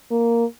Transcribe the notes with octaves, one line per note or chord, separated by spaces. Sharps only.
A#3